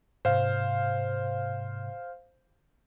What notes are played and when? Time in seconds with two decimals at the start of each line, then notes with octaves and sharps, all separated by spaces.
0.25 G#2 C3 C5 F5